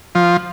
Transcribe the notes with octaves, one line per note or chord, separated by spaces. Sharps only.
F3